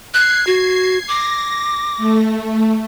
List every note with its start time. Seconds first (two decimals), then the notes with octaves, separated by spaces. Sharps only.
0.14 F#6 G#6 C7
0.47 F#4
1.08 D6 A#6
1.97 A3